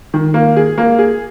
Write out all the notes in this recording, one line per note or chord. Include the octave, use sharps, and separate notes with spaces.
D#3
A#3
G#4
A#3
G#4